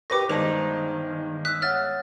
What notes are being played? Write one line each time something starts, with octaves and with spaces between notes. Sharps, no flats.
G4 A#4 B4 C#6 D6 A#6
G1 D#3 G#3 C5 D5 A5 F7
D#6 E6 F#6 B6
C#5 E5 F#5 F6 A6